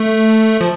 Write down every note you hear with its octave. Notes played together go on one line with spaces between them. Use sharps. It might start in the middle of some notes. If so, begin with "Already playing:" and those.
Already playing: A3
F3